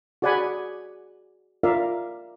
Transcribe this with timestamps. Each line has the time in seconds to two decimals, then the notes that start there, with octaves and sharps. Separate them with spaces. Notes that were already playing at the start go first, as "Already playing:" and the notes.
0.22 F#4 G#4 D5 F#5 G#5 B5
1.63 F4 A#4 D5 E5 F5